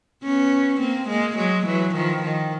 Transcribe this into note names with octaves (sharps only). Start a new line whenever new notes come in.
B3 C#4
A#3 C4
G#3 A#3
F#3 G#3
E3 F#3
D#3 F3
D#3